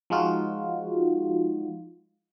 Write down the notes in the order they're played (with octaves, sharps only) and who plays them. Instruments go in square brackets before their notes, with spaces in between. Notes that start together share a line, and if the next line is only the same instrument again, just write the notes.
[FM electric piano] F3 G#3 D#4 F4 F#4